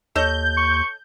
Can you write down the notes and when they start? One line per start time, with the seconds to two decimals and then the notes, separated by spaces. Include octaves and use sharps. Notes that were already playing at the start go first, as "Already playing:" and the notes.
0.15 D#2 A4 C#5 D#5 G6
0.57 C#6